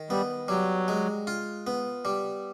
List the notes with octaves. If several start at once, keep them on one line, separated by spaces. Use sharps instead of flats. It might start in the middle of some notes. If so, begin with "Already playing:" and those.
Already playing: D#3
G3 B3
F#3 G3
G#3
F4
B3
G3